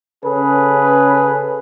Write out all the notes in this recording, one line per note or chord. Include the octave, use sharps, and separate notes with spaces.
C#3 C#4 G#4 A4 B4